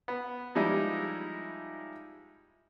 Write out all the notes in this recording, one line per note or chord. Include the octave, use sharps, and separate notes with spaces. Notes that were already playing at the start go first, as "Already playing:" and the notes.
B3
F3 G3 G#3 D#4 E4